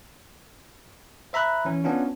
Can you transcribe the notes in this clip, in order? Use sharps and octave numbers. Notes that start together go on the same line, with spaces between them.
C5 E5 A#5 B5 F#6
E3 C#4
B3 C#4 D4 F4